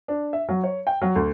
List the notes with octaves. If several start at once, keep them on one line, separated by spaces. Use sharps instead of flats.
D4
E5
F#3
C#5
G5
F#3
D2